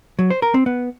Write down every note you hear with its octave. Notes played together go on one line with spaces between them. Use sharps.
F#3
C5
A#4
C4
B3